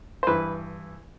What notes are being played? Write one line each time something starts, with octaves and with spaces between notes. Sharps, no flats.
C5
G2 E3 B4